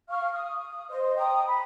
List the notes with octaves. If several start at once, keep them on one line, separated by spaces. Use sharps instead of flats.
F5 C#6 F6
D#6
C5 D#5
G5 A#5 D#6
B5